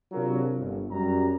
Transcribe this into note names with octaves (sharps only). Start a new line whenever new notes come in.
C3 F#3 D4 F4 G#4 A#4
G1
F#2 G3 A#5